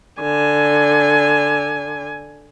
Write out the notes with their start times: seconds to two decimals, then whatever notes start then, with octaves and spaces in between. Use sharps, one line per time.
0.21 D3 G#5